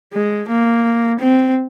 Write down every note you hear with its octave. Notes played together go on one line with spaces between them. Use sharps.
G#3
A#3
C4